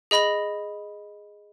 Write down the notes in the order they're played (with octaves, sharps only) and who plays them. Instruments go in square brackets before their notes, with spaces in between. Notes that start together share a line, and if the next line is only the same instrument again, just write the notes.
[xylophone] G#4 D#5 B5 A#6 F#7